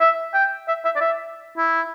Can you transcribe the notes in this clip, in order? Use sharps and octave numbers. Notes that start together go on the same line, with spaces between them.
E5
G5
E5
E5
D5
E5
E4